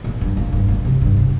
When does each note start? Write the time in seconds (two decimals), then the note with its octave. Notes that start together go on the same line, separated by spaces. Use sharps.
0.04 A#2
0.21 G2
0.37 A#2
0.53 G2
0.68 A#2
0.85 C3
1.01 G2
1.17 C3